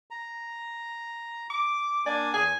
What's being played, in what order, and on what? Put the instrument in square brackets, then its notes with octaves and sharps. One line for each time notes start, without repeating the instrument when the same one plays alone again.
[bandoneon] A#5
[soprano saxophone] D6
[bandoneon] A#3 D4 G#5 [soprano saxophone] D5
[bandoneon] E2 [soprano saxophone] G#5